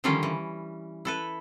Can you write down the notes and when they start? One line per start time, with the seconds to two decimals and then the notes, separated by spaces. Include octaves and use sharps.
0.04 D3 D#3 F3 G3 C#4 F4
0.23 E3
1.05 E4 A4 B4